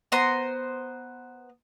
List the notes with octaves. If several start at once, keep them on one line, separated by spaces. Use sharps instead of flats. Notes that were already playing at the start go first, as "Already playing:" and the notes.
B3 C5 A#5 C6